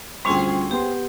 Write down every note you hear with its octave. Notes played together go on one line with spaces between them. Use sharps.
D2 G3 C4 C#4 F4 G#4 C6 C#6
B3 G4 C6